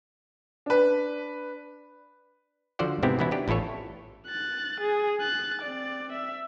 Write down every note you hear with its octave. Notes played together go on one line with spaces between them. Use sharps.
D4 B4
D3 F3 F#4 C5 D5 F#5
G#2 C3 B3 C4 E4 G4
B2 E3 B3 C#4 E4
D4 G4 B4
A1 E4 F4 A4 C#5
F#6 A6
G#4
F#6 A6
C4 D5
E5